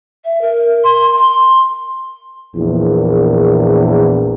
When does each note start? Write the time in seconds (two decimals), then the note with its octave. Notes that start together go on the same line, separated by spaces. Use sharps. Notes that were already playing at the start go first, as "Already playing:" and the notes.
0.24 E5
0.41 A#4
0.84 C6
1.16 C6
2.56 A#1 E2 A#2